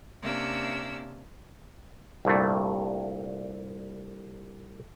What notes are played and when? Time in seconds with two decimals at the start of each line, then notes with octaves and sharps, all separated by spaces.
0.21 C3 A#3 C#4 D4 E6
2.25 C2 G2 A#2 A3